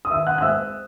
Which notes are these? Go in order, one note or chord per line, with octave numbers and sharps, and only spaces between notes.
D#6
D#3 E5 E6
F#5 F#6
F#6
G#3 C4 E5 E6